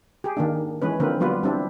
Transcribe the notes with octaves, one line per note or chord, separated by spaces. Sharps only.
G4 G#4
D#3 A#3 D4
E3 G#3 C#4 B4
D3 F3 A#3 C4 A#4 B4
F#3 G3 B3 F4 B4
G3 C4 D4 E4